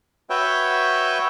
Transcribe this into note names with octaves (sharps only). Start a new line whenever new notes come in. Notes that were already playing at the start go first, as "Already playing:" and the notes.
F#4 B4 C#5 E5 G5